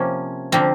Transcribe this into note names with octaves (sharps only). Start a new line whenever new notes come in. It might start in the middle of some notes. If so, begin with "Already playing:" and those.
Already playing: C3 F3 A#3 C#4
D3 F3 A#3 C4